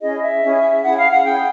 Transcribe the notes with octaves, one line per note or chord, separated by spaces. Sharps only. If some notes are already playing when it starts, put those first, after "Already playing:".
C#4 E4 G#4 D#5
E5
C#4 E4 G#4
C#4 E4 G#4 F#5
F5
F#5
C#4 E4 G#4 G5